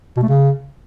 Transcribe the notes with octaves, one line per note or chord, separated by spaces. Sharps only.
B2
A3
C#3